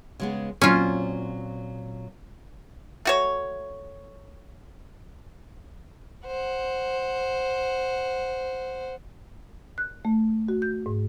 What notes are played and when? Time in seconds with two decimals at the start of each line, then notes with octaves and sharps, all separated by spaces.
0.20 C#3 G#3 B3
0.62 A#2 F#3 C4 C#4 F4
3.05 A3 F#4 C#5
6.27 C5 F#5
9.78 F#6
10.05 A3
10.49 F#4
10.62 G6
10.86 G#2